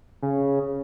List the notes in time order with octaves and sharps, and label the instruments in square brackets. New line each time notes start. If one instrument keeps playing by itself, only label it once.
[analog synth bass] C#3